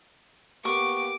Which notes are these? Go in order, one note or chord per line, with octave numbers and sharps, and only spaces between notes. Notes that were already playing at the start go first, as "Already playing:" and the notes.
A#3 B3 G4 C#6 D6